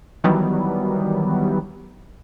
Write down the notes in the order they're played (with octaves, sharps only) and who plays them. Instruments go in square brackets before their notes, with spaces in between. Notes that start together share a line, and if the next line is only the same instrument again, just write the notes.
[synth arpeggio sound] D#3 E3 F#3 G3 B3